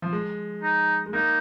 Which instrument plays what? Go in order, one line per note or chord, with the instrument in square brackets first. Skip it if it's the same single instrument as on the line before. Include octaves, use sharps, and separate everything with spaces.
[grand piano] F3
G#3
[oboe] D#4
[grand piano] G#3
[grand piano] A#3 [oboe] D#4